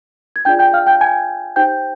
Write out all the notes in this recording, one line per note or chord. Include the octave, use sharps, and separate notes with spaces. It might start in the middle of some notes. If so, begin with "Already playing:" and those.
G#6
D4 F4 G#4 D5 G5 G6
G5 G6
F5 F6
G5 G6
G#5 G#6
D#4 G4 C5 G5 G6